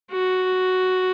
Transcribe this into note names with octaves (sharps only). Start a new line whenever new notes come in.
F#4